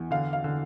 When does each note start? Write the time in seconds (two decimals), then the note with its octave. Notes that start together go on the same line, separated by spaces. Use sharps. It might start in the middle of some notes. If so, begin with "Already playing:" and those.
Already playing: E2
0.11 D3 F5
0.33 F5
0.44 D3